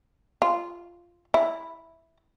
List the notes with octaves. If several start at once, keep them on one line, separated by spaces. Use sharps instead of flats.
F4
E4